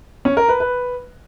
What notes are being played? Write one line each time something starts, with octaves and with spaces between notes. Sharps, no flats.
C#4
A#4
B4
B4